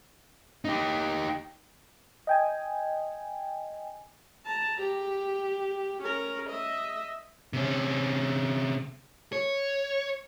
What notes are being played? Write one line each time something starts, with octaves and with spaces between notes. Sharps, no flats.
D#4 G4
D#5 G5 G#5
A5 A#5
G4
C#4 A#4
D#5 E5
C3 C#4
C#5